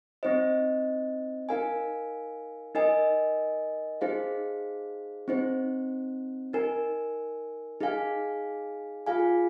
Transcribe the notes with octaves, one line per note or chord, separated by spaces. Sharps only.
C4 D#4 C5 D#5
D#4 A#4 F5 G#5
D#4 A#4 D#5 G#5
D#4 G#4 C5 F5
C4 D#4 C5
D#4 A#4 G#5
D#4 G#4 F5 G#5
F4 G#4 F5 G#5